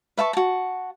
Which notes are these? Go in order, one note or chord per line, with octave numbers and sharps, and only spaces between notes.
B4 E5 A5 C#6
F#4 A5